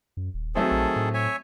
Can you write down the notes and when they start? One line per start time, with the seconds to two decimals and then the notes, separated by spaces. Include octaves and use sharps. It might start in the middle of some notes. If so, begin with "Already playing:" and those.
0.17 F#2
0.34 D#1
0.55 D#3 F#3 A3 C4 G#4 A4
0.71 A#1
0.96 A2
1.14 C#5 E5 G#5